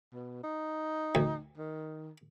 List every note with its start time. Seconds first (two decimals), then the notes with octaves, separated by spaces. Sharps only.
0.13 B2
0.44 D#4
1.15 D2
1.57 D#3